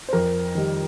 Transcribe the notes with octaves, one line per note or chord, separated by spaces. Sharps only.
C5
F2 A#4
D#3 G3